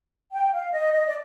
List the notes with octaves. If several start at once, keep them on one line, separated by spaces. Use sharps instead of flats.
G5
F5
D#5
D#5
D5